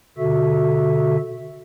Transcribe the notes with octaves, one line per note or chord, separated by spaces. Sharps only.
B2 D3 F#4 A4 E5